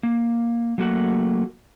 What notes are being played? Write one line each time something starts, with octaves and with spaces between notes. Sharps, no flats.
A#3
F#3 A3 A#3 F#4 A#4 F#5